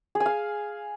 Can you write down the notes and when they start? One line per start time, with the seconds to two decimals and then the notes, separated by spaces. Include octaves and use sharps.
0.15 G#4
0.20 G#5
0.26 F5